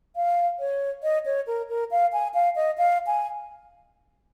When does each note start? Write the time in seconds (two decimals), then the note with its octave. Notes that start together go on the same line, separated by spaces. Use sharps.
0.16 F5
0.59 C#5
1.03 D#5
1.26 C#5
1.47 A#4
1.69 A#4
1.91 F5
2.13 G#5
2.34 F5
2.56 D#5
2.78 F5
3.07 G#5